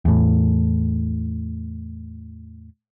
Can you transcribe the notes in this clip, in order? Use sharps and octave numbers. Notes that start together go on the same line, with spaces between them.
E2 A2